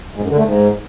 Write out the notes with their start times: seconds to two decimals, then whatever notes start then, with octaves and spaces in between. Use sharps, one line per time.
0.16 G#2
0.23 F#2
0.31 D3
0.38 A3
0.45 G#2